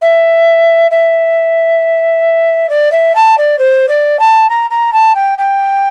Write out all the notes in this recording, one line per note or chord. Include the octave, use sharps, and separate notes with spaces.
E5
E5
D5
E5
A5
D5
C5
D5
A5
A#5
A#5
A5
G5
G5